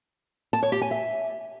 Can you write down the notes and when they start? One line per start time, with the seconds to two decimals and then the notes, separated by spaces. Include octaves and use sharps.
0.53 A5
0.63 C#5
0.72 G4
0.82 G#5
0.91 E5